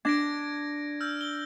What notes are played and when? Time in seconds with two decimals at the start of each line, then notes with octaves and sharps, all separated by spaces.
0.05 D4 G#6 A#6 D7
1.01 E6 F6 G6
1.21 G7